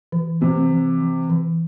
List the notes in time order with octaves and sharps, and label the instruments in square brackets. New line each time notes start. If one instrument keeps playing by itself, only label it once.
[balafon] E3
[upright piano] C3 [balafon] E3
[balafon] E3
E3
E3